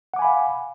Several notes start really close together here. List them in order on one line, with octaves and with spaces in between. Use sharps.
F#5 D6 G#5 B5 F5